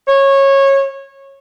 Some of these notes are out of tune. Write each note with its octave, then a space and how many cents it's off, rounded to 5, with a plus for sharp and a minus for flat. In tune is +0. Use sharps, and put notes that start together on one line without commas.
C#5 -20